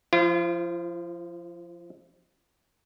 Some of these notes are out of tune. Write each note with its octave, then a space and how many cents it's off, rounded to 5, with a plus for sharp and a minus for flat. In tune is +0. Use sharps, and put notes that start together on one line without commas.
F3 +0 F4 -40